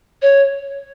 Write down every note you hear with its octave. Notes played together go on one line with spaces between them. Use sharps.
C#5